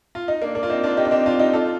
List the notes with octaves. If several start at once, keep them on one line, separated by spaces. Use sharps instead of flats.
F4
D#4
A#3 D4
A#3 D4
F4
C4 D#4
D4 F4
D#4 G4
D4
C4 D#4
D4 F4
D#4 G4
F4 A4